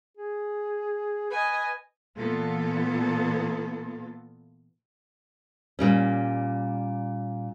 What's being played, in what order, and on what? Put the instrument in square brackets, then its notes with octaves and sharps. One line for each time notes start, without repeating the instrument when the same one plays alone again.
[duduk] G#4
[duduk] B4 [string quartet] D#5 G#5
[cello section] A#2 E3 A#3 B3 F4 A4
[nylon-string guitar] A#2 G3 C#4